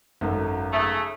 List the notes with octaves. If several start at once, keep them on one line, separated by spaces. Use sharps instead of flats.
G#1 F#2 A4
C#3 A3